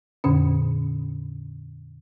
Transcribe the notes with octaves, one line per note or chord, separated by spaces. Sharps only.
F2 A#2 D3 C#4